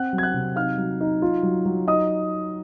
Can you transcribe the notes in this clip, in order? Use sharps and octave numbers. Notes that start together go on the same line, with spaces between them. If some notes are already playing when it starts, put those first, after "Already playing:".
Already playing: C4 F#5 F#6
F#3
G#6
F#5 F#6
C3
D#4 F5 F6
F#3
D#4
F4
F#3
F#3
D#4 D#5 D#6